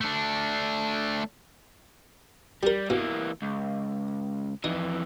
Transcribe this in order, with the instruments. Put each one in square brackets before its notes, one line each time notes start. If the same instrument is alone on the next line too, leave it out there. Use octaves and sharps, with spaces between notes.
[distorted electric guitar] A3 D4
[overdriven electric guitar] G3 [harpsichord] G4 A#4
[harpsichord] B2 [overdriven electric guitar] E3 A#3
[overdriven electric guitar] C#2
[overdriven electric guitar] F2 E3 [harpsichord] D#4